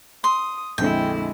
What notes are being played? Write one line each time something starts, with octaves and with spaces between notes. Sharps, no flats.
C6 D#6
A#1 F2 D3 G#3 E4 G5